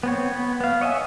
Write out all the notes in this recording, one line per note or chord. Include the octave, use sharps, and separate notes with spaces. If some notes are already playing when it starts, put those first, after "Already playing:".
B3 C4 C#5
B3
B3 F5
C#5 D#5 E5 F#5 G#5